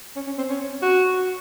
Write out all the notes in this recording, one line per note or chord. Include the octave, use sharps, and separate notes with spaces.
C#4
C#4
C4
C#4
F#4